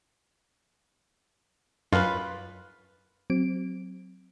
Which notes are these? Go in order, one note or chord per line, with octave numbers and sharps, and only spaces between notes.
F#2 F4 B4
F#3 C4 D7